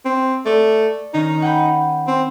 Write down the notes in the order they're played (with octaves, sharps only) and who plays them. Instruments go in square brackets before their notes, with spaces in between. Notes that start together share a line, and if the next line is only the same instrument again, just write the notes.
[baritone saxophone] C4
[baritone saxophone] A3 [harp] D5
[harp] D#3 C#4 A#6 [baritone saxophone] D#4
[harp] F#5 G5 B5
[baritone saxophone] C4